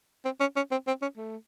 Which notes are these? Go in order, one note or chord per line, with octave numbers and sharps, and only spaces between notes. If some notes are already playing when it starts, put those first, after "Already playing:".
C4
C#4
C#4
C4
C4
C#4
A3